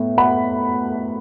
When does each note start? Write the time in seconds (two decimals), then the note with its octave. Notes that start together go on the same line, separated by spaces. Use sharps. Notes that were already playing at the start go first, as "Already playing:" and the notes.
Already playing: A2 B3
0.18 F#5 B5